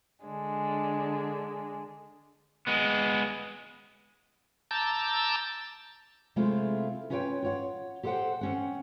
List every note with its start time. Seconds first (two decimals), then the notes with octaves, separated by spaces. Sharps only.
0.24 D3 G#3 D4
2.67 G#3 B3
4.71 A5 A#5 D6 E6 G6 A6
6.36 C3 G#3 A3 C4 E4 F4
7.10 C#4 F4 B4 C#5 F#5 G5
7.42 F4 C#5 F#5
8.03 G4 A4 C5 C#5 F#5 G5
8.41 C4 C#4 F#5